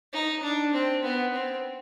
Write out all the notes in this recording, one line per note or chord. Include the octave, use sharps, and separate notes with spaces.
D#4
D4
C4
B3
C4